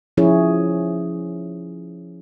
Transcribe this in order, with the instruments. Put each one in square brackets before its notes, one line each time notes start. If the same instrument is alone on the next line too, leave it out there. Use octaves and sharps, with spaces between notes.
[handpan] F3 C#4 E4 G#4 C#5